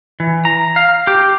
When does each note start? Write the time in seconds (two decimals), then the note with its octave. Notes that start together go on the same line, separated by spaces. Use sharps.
0.20 E3
0.45 A#5
0.76 F5
1.07 G4